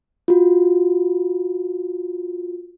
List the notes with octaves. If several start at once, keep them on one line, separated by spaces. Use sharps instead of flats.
F4 F#4